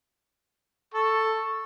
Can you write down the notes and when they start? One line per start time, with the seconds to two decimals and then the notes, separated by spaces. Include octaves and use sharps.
0.94 A4 C#6